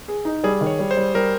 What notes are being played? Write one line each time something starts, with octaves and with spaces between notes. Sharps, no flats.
G#4
D#4
G3 G#4
D#3
C#5
G3
C5
G3
G3 A#4